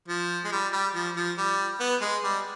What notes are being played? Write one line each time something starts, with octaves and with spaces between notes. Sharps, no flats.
F3
G#3
G3
G3
F3
F3
G3
B3
G#3
G3